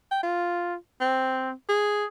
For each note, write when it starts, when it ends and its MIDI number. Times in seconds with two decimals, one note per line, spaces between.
0.11 0.22 79
0.23 0.75 65
1.01 1.52 60
1.69 2.06 68